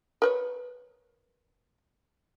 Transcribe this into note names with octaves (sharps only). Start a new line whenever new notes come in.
A#4 B4 C#5